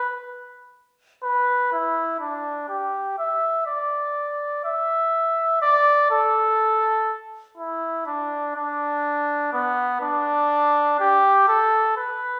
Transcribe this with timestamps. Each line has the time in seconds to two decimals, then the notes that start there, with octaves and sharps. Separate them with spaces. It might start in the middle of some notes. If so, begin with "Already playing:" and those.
Already playing: B4
1.23 B4
1.72 E4
2.20 D4
2.69 G4
3.18 E5
3.67 D5
4.65 E5
5.62 D5
6.11 A4
7.58 E4
8.06 D4
8.55 D4
9.53 B3
10.01 D4
11.00 G4
11.48 A4
11.97 B4